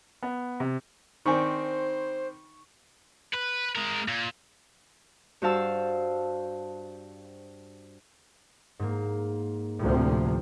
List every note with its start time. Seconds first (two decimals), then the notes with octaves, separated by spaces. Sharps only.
0.23 B3
0.60 C3
1.26 D#3 C4 D4 D#4 C5 G#5 B5 C#6
3.34 B4
3.76 G#3 A#4
4.08 A#2
5.42 G2 F#4 C5 F5 A5 E6
8.79 G#2 A#3
9.79 D2 A2 C3 F3